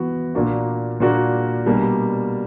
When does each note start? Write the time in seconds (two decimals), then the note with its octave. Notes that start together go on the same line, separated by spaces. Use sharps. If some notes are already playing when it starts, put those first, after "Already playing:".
Already playing: E3 B3 F#4
0.35 A#2 A#3 D4 F#4
1.00 A#2 A#3 D4 F#4
1.66 B2 G3 A#3 D4